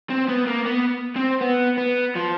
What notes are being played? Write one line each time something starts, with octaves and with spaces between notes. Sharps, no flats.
C4
B3
A#3
B3
C4
B3
B3
F3